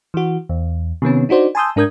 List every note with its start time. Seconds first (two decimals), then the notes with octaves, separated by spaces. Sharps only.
0.14 E3 F#4
0.49 E2
1.02 C3 D#3 B3 C#4
1.29 D4 D#4 F#4 C5 D5
1.55 G#5 A5 C6 D#6 E6 G6
1.76 G#2 D4 A#4 D#6 G6 G#6